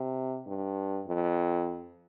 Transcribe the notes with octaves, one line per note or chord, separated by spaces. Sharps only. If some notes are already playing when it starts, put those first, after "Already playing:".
Already playing: C3
G2
F2